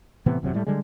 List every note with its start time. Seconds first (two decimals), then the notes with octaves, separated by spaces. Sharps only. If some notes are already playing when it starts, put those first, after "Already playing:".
0.26 A2 C3 E3 B3
0.42 G1 E2 C3 F#3
0.54 A2 G3 A3
0.67 D3 G3 G#3